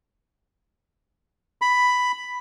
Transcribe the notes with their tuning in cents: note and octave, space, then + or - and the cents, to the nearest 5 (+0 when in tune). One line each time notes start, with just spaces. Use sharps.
B5 +5